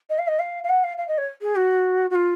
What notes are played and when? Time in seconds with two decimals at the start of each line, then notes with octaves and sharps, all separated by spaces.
0.10 D#5
0.19 F5
0.28 D#5
0.39 F5
0.64 F5
0.69 F#5
0.84 F5
0.98 F5
1.08 D#5
1.18 C#5
1.41 G#4
1.56 F#4
2.10 F#4
2.15 F4